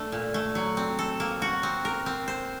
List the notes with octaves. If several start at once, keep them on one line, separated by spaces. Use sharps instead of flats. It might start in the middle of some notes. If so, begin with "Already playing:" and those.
Already playing: A3 D4
A#2
A3
F#3
C4
A4
A#3
F#4
C4
A#4
C4
C5